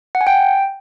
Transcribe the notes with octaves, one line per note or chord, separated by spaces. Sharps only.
F#5
G#5
G5